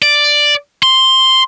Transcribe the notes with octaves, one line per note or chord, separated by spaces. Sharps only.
D5
C6